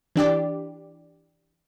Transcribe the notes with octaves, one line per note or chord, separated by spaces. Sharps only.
E3 D4 G4 D5